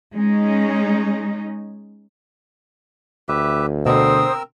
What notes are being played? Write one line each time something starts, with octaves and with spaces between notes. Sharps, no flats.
G#3 C#4 D#4
D2 G4 B4 E5
B2 D3 C4 A#4 C5 D#6 E6